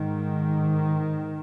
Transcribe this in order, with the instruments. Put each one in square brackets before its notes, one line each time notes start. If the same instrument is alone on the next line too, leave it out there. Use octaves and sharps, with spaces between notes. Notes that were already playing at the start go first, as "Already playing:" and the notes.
Already playing: [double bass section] G#2 D#3